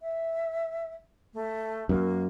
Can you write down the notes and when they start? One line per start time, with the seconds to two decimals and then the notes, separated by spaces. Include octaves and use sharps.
0.01 E5
1.34 A3
1.89 F#2 A#3